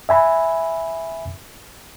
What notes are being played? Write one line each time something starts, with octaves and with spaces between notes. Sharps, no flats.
E5 G#5 B5